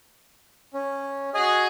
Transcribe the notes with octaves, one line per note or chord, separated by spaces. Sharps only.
C#4
F#4 G#4 D#5 G#5